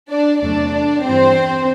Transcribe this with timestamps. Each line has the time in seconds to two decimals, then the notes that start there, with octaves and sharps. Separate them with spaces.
0.11 D4 D5
0.41 E2 C3 F#3 A3 D4 D5
1.03 G2 E3 G3 C4 C5